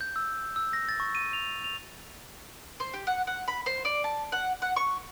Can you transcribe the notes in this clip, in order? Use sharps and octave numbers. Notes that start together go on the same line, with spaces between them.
G6
E6
E6
A#6
A6
C#6
D#7
F7
F7
C5
G4
F#5
F#5
B5
C5
D5
A5
F#5
F#5
C#6